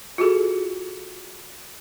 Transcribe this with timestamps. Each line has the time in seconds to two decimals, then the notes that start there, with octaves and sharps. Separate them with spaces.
0.18 F4 F#4 G#4 A4